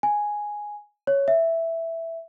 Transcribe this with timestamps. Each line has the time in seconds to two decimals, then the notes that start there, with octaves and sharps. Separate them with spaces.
0.03 G#5
1.07 C#5
1.28 E5